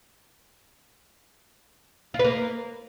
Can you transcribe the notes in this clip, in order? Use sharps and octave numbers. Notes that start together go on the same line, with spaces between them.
F4
B4
A#3